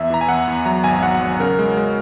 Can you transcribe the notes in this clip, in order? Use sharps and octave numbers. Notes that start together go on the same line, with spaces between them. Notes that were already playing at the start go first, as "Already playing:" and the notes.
Already playing: E2 E5
E3 A#5
G#5
E2 F#5
E2
F#3 A#5
G#1 G#5
G#5
F#3 F#5
F#3
C#3 A#4
G#3
G#3